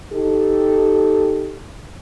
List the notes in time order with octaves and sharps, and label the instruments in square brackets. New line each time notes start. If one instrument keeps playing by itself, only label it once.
[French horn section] D#4 G4 A4